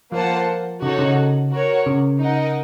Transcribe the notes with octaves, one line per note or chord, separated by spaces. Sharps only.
F3 A#3 F4 C5 F#5 A5
C#3 D#4 F#4 A4 C#5 F#5
C#3
F#4 A#4 C#5
C#3
D#4 A#4 D#5 F#5